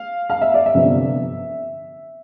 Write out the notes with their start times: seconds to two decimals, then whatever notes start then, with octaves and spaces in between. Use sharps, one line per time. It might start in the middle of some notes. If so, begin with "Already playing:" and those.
Already playing: F5
0.30 F5
0.41 E5
0.54 D5
0.66 E5
0.74 G1 F2 C3 F3 B3